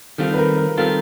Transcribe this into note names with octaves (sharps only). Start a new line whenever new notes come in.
D#3 G3 C4 F4 A4
B4
A#4
A#4
D#3 G3 C4 F4 A4